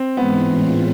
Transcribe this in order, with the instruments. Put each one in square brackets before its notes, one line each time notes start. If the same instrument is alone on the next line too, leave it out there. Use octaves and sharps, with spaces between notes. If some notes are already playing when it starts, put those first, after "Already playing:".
Already playing: [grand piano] C4
[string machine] G#2 E3 G#3 [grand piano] B3
[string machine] A2 E3 G#3 C#4 F4